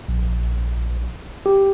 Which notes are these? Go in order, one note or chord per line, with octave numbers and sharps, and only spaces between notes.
A#1
G4